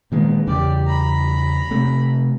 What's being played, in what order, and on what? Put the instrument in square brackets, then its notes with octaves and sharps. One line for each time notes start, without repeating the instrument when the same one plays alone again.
[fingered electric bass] A#2 D#3 G#3 [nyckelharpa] B3
[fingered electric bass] E2 C#3 [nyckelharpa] G4 D5
[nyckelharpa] A#5 B5
[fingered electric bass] C3 A3